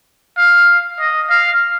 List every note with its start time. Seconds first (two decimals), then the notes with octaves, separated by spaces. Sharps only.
0.37 F5
1.00 D#5
1.30 F5